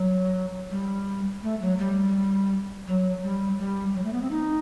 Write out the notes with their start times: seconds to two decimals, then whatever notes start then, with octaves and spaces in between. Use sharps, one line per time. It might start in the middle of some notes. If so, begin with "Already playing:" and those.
Already playing: F#3
0.71 G3
1.43 A3
1.61 F#3
1.78 G3
2.87 F#3
3.23 G3
3.59 G3
3.94 F#3
4.04 A3
4.13 B3
4.22 C4
4.31 D#4